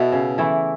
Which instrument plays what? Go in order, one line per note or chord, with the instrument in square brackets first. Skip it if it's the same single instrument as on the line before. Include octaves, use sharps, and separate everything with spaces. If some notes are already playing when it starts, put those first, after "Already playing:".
Already playing: [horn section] B2 [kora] B3 E4 A4 E5
[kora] C#3
E3 A3 E4